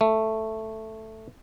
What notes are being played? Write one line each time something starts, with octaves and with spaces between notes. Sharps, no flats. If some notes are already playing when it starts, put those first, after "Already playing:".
A3